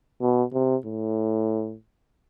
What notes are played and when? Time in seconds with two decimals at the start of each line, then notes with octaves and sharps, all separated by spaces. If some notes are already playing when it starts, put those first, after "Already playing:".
0.21 B2
0.53 C3
0.85 A2